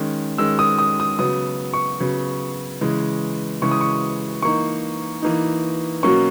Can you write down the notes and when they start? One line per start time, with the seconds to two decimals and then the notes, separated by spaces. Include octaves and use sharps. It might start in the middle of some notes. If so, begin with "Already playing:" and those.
Already playing: D#3 G#3 C#4
0.38 D#3 G#3 C#4 E6
0.59 D#6
0.78 D#6
1.00 D#6
1.19 C#3 F#3 B3 D#6
1.73 C#6
2.00 C#3 F#3 B3
2.81 C#3 E3 G#3
3.62 C#3 E3 G#3 C#6
3.71 D#6
3.81 C#6
4.43 E3 A#3 D#4 C#6
5.22 E3 A#3 D#4
6.03 B2 F#3 A#3 C#4 C#6